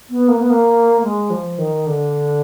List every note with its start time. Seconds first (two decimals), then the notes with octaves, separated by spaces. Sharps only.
0.10 B3
0.28 A#3
0.39 B3
0.50 A#3
1.03 G#3
1.30 F3
1.58 D#3
1.86 D3